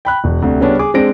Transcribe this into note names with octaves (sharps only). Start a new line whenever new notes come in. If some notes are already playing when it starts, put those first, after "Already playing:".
G5 B5 F#6
E1
D2 C3
C#3 G3 B3 C#4 D4
G#4 D6
G#3 C4 D4 A#6 D7